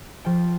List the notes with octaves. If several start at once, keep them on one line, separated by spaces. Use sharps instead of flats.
F3 G5